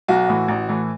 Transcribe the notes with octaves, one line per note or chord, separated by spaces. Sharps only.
B1 F#4
A2 E3
A1
A2 E3